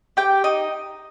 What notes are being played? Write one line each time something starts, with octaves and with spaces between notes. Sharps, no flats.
G4 G5
D#4 D#5